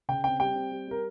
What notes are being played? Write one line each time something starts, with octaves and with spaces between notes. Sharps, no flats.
C#3 G5
C4 G5
G3 G5
C4
G3
G3 A#4